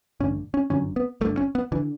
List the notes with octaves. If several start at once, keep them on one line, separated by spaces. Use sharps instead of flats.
A1 G2 D3 C#4
C#4
G1 F#2 D3 C#4
B3
G1 G2 D3 A3
C#4
B3
D3 E3